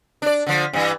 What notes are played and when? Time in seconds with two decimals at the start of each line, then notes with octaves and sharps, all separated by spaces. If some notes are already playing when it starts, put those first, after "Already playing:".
0.22 D4 D5
0.46 D3 F3
0.73 G2 E3